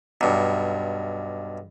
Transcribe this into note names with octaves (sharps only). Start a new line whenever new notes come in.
B1 G2